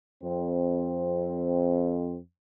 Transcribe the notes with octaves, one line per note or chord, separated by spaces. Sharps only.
F2 C4